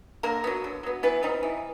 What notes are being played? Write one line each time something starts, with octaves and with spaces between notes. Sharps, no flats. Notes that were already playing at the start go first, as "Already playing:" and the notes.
D3 A#3 A#4
F#3 B3
D3
F#3 B3
E3 B3 B4
G3 C4 D#4
E3